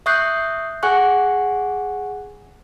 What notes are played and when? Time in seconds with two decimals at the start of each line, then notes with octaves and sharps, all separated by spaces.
0.06 E5 C#6 D#6 F#6 G6 C7
0.83 G#4 F#5 G#5 C#6 F#6